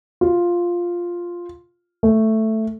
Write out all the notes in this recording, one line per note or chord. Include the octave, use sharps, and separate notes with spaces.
F4
A3